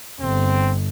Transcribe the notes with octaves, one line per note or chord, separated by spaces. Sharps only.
G1 C4